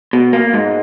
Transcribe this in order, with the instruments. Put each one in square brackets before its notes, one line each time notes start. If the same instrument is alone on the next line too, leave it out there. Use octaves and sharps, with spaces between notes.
[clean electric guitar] B2
A#3
G#2